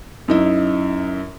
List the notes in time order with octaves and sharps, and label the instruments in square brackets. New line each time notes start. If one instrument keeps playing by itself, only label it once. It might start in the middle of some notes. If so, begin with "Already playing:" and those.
[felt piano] F#2 D#4 E4